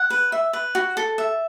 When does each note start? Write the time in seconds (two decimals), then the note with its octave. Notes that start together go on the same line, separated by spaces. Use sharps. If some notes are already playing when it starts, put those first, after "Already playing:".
Already playing: F#5
0.10 B4
0.32 E5
0.53 B4
0.75 F#4
0.97 A4
1.18 E5